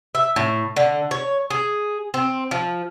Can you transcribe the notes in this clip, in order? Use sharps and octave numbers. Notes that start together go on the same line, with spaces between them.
E5
A2
D3
C#5
G#4
C4
F3